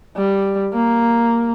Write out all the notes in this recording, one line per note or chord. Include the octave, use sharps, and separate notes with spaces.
G3
A#3